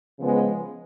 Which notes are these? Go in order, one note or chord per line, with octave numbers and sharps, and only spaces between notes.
C#3 F3 G#3 B3